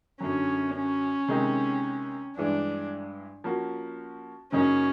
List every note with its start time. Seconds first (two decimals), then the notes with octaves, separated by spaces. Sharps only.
0.20 F#2 D3 F#3 C#4
0.75 C#4
1.28 C3 D#3 G#3 C4 D#4
2.36 G2 E3 G#3 D4
3.44 F3 A#3 C#4 F#4
4.52 F#2 C#3 F#3 A#3 C#4 D#4